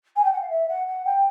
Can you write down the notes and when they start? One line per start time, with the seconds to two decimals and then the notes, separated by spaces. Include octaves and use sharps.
0.16 G#5
0.24 G5
0.32 F#5
0.41 F5
0.50 E5
0.69 F#5
0.87 F#5
1.05 G5